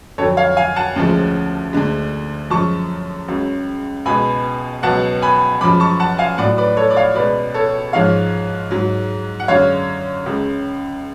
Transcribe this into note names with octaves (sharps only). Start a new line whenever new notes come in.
F2 D3 F#3 A4 C#5
C#5 F5
F5 G#5
F#5 A5
D2 C#3 F3 G#3
D2 D3 G#3
F#2 F3 G#3 A5 C#6
C#2 C#3 F#3
C#2 B2 G#3 G#5 B5
C#2 B2 F#3 F#5 A5
G#5 B5
F#2 F3 G#3 B5 D6
A5 C#6
F#5 A5
F5 G#5
A2 F#3 D5 F#5
B4 D5
A4 C#5
D5
C#5 F5
C#2 B2 G#3 B4 D5
A4 C#5
G#2 F3 G#3 C#5 F5
G#2 F#3
F#5
F#2 D3 G#3 C#5 F5
C#2 C#3 G#3